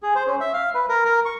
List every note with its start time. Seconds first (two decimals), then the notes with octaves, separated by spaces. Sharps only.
0.03 G#4
0.15 C5
0.27 C#4
0.40 E5
0.53 F5
0.74 B4
0.89 A#4
1.05 A#4
1.25 C#6